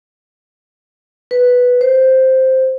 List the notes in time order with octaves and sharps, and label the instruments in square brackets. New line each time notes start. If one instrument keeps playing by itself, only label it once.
[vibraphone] B4
C5